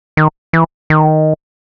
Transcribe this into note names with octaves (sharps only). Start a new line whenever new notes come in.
D#3
E3
D#3